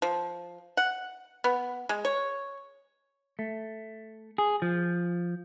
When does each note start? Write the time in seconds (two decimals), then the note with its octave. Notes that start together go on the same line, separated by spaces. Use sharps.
0.02 F3
0.77 F#5
1.44 B3
1.89 G#3
2.05 C#5
3.39 A3
4.38 G#4
4.62 F3